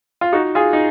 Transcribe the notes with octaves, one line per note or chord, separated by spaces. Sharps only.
F4
D#4 F#4
F4 G#4
D#4